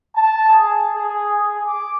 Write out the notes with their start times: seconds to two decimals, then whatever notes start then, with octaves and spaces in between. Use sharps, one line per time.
0.16 A5
0.49 G#4
0.95 G#4
1.36 G#4
1.66 D6